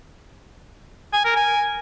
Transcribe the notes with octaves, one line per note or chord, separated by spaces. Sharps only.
G#5
A#4
G#5